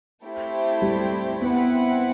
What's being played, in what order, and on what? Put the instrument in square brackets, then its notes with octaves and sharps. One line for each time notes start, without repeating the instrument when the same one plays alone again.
[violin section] A3 C4 E4 G4 C5
[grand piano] G3
[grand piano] B3 [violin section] C4 E4 B4 F#5